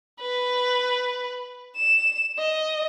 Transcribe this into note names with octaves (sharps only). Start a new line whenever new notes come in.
B4
E7
D#5